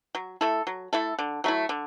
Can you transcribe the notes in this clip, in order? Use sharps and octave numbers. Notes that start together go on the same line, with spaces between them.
F#3
A3 E4 A4
F#3
A3 E4 A4
D3
F#3 A3 E4
D3